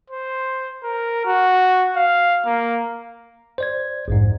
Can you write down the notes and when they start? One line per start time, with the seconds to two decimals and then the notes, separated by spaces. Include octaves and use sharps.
0.10 C5
0.83 A#4
1.25 F#4
1.96 F5
2.46 A#3
3.58 C5 D5 G#6
4.08 A#1 F2 G#2